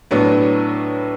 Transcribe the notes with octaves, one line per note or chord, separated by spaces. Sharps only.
A2 F#3 B3 D4